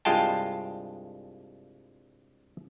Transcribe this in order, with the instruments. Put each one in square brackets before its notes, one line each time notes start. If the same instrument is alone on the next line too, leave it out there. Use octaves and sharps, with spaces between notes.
[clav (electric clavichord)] C2 G2 G#3 F4 G5 A5